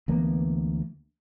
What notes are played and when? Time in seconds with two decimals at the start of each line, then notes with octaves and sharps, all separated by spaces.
0.08 D2 E3 A#3 B3